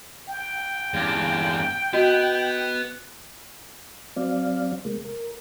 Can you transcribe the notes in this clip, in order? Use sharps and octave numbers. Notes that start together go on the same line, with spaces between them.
G5
E2 G2
B3 F#4 D#5
F#3 C4 D5 F5
C3 G#3 A#3
A#4